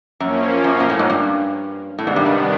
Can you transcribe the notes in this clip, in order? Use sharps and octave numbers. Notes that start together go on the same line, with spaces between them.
F#2 F3 A#3 C#4
F#2
A#2
A2
G#2
G2
A2 C3 D#3 G3 B3 D4
G#2
G2
G#2